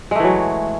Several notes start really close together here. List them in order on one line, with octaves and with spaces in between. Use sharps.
G#3 A3 E3 F#3